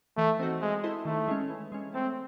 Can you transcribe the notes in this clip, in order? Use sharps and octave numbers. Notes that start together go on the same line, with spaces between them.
E3 A3
C4 D#4 F#4
G#3 C4
E4 A4 C5 D#5
D#3 A3
G#3 C#4
E3
G#3 C#4
A3 C4